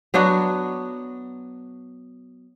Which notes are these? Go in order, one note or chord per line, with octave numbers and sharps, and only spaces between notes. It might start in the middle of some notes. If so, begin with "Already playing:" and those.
F#3 B3 D4 F#4